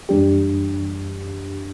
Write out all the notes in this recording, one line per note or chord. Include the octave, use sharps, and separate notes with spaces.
F#2 E3 G3 D4 G4